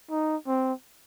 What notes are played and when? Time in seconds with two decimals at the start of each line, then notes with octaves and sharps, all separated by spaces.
0.10 D#4
0.47 C4